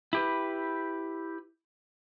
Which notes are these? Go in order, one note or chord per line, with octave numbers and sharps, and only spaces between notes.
E4 G4 B4